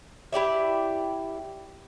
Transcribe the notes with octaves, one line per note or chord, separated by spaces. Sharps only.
E4 G4 D5 E5